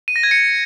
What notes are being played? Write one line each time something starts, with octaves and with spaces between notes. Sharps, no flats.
D#7
A#6
G#6
C#7